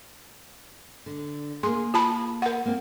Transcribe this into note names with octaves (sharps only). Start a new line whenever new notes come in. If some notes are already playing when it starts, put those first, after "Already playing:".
D3
A#3 G#4 C6
F4 A5 B5
A#4 F#5
A#3 C4